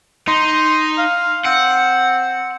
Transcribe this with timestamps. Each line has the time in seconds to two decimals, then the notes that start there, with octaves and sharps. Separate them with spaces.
0.28 D#4 C6
0.98 F5
1.46 C4 F#5